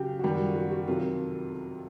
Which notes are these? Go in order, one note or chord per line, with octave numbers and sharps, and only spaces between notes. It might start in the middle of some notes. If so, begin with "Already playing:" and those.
Already playing: C#3 F#3 G4
F#4
F#2 D#3 G3 G4
F#4
F4
F#4
F#4
F2 C3 D#3 F#3 F4